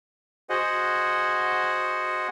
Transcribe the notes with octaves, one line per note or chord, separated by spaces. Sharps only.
F#4 G#4 C5 D#5 F#5